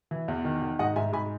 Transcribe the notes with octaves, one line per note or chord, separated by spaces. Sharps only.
E3
E2
D#3
D#3
G#2 D#5 F#5
G#2 E5 G#5
G#2 G#5 B5